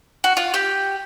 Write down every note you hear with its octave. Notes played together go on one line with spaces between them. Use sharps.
F#4
F4
G4